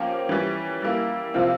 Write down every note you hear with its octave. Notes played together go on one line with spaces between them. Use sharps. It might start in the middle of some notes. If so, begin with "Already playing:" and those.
Already playing: F3 A#3 C#4 G4
E3 G3 C#4
G3 A#3 E4
C3 F3 C4 F4